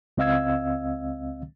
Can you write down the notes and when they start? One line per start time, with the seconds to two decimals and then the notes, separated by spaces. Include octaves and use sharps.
0.17 C#2 C4 D#5 F5 E6 G#6